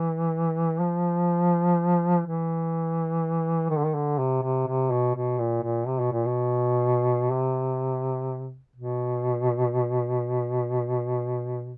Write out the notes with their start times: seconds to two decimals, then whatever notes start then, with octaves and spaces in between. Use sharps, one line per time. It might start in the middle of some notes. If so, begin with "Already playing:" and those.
Already playing: E3
0.81 F3
2.26 E3
3.70 D#3
3.78 D3
3.86 D#3
3.94 D3
4.18 C3
4.42 C3
4.67 C3
4.91 B2
5.15 B2
5.39 A#2
5.63 A#2
5.87 C3
6.00 B2
6.12 A#2
6.25 B2
7.31 C3
8.76 B2